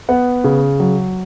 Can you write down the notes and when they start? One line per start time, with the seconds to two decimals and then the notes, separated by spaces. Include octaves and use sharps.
0.09 B3 F#5
0.44 C#3
0.80 F#3